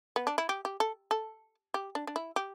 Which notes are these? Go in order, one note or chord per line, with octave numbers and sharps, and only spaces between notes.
B3
D4
E4
G4
G4
A4
A4
G4
D4
D4
E4
G4